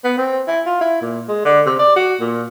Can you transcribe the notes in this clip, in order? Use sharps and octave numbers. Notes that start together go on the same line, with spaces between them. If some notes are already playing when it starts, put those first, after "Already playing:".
B3
C4
E4
F4
E4
A#2
G#3
D3
C3
D5
F#4
A#2